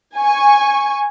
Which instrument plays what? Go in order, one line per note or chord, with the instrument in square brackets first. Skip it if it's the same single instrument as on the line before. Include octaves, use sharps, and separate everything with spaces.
[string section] G#5 C#6